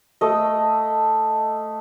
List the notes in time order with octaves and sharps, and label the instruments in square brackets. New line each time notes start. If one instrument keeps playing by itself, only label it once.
[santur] A3 D#5